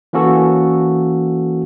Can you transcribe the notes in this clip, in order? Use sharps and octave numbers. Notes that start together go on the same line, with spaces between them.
E3 A#3 C#4 F#4 A4